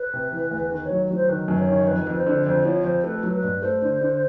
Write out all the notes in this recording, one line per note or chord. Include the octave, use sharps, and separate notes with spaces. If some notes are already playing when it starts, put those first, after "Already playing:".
Already playing: B4
C3
E3
E2
D#3 B4
C#5
F#3
F#3 C5
D#3 B4
F#2
C#5
D#3
F2 B4
F2
C5
D3
F2 C5
F3 C#5
F2 C5
A3 B4
F#3
B4
G2
A3 C5
D3
D3